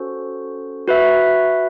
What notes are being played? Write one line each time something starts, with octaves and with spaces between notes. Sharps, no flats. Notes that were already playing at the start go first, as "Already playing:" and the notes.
Already playing: C#4 F#4 A4 C5
F#4 B4 E5